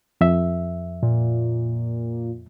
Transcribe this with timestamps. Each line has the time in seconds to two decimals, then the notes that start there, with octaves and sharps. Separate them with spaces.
0.21 F2 E5
1.03 A#2